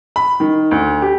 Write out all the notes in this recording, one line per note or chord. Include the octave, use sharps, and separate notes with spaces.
B5
D#3
D2
G4